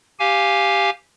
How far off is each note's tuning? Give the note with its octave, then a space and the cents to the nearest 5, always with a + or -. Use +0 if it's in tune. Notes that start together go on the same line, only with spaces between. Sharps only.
G4 +0 F5 +0 G#5 +0